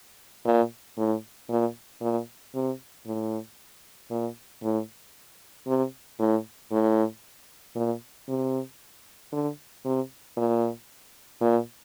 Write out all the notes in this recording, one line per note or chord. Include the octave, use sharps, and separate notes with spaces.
A#2
A2
A#2
A#2
C3
A2
A#2
A2
C3
A2
A2
A#2
C3
D3
C3
A#2
A#2